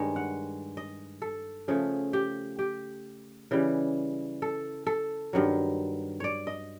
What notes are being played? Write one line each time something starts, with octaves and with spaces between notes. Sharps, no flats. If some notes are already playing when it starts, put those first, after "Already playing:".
Already playing: G2 D#3 G#3 C#5
F#5
D#5
A4
C#3 F3 A3 G#4
G4
G4
C#3 E3 G3
A4
A4
G2 D#3 F#3
C#5 D5
D#5